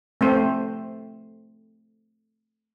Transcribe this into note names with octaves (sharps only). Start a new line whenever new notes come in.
A3 C4 C5